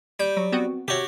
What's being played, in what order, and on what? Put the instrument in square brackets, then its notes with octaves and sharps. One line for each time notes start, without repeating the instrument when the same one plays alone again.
[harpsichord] G3 [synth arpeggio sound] G6
[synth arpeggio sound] F#3
B3 C4 F#4
[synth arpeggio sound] C3 C#5 [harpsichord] F#4 G4